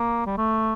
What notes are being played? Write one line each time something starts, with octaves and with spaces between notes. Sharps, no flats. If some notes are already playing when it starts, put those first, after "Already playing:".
Already playing: A#3
G3
A3